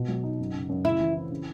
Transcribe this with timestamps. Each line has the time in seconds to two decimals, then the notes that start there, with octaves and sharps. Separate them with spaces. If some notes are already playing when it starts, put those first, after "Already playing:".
Already playing: B2
0.08 F#3
0.23 D#4
0.39 F#2
0.54 C#3
0.69 F#2
0.85 C#3 E4
1.00 E3
1.15 C4
1.31 C#3